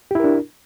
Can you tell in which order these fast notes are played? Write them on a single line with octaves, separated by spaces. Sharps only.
G4 E4 A#4 D4